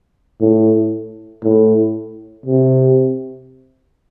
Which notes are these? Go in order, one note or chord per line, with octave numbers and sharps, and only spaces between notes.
A2
A2
C3